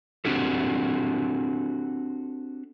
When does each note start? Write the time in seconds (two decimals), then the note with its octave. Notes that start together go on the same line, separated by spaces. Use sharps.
0.25 C4 D4 F#4 G4 A4